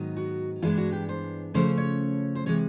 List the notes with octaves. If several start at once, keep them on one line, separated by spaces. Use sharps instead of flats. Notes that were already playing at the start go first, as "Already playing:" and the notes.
Already playing: G#2 D#3 F#3 B3 D#4
F#4
G2 E3 G#3 B3 D4 F4
F#4
G4
C5
C#3 F3 A3 C#4 C5
C#5
C5
C3 E3 G#3 C#5